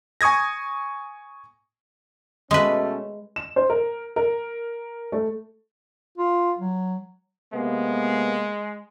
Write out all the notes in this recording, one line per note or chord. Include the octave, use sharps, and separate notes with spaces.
G#5 C#6 D#6 G#6 A#6
B2 G#3 A3 C#4 B4
E7
C5
A#4
A#4
A3
F4
F#3
C3 G#3 A#3 B3